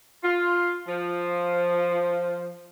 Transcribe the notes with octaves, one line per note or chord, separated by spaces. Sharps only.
F4
F3